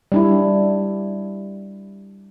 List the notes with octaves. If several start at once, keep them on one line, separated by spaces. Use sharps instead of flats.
G3 D4 E4